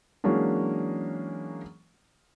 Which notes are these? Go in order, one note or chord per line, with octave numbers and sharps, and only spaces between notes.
E3 F#3 G#3 A#3 C#4 D4